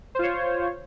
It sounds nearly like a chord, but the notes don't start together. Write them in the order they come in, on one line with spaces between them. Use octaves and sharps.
C5 F4 C#5